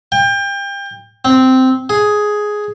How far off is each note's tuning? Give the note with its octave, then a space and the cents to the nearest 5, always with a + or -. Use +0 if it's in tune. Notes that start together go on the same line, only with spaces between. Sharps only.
G5 +30
C4 -10
G#4 +5